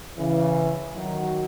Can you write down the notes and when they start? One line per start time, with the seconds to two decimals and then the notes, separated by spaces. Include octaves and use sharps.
0.18 C#3 E3
0.95 D#3 F#3